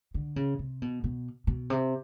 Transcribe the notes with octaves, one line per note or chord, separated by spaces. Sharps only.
D3
C#3
C3
B2
B2
B2
C3